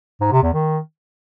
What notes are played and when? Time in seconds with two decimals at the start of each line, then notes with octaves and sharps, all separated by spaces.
0.21 G#2
0.32 C3
0.43 E2
0.53 D#3